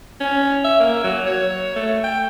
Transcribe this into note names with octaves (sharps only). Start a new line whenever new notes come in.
C#4
E5
A#3
F#3
C#5
A3
G5